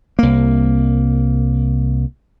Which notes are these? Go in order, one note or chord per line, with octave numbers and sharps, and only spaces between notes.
C2 A#3